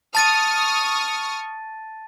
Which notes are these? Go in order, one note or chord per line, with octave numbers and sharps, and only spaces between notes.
A5 C#6 D#6 F6 A6 D#7